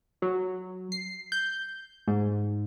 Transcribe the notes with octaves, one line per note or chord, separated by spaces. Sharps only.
F#3
C7
G6
G#2